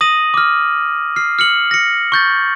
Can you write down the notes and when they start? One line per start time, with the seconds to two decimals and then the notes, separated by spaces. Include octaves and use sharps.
0.01 D#6 A#6 D#7 F#7
0.34 D6 F6
1.16 F6 C7
1.39 F6 C#7 F#7
1.71 A#6 C#7
2.12 C#6 G6 A6